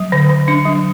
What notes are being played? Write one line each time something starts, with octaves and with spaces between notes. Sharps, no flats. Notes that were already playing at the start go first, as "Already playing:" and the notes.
Already playing: F#3
D3
D3
D4
F#3